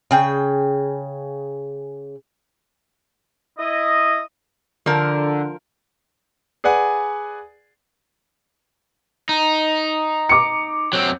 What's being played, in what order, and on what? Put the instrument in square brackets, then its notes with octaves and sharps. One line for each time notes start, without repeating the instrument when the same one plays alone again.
[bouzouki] C#3 G#4 G5
[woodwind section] E4 D#5
[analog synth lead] D3 [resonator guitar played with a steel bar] F3 A#4
[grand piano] G#4 B4 D5 F#5 G#5
[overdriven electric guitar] D#4
[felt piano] D6 C#7
[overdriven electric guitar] F#3 C4